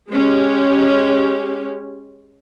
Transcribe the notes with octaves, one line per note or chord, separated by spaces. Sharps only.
G#3 C#4 G4